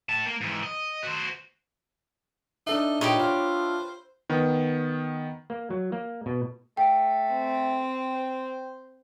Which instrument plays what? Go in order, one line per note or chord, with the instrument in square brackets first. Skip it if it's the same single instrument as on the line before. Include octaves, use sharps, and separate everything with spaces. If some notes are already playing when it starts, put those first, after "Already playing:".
[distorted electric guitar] A2 A5
A#3
G#2 E3
D#5
F#4 C5
[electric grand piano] D4 A4 E5 [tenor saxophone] D#4
[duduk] A#2 [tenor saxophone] D#4 [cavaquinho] G4 B4 C#5
[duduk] F4 [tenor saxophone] C5
[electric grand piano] D#3 B3
[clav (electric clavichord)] A#3
F#3
A#3
B2
[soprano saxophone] A3 [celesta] G5
[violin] C4
[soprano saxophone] C5